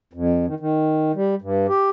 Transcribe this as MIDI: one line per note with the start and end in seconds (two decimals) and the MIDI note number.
0.13 0.46 41
0.46 0.55 51
0.60 1.12 51
1.15 1.35 55
1.42 1.67 43
1.69 1.90 67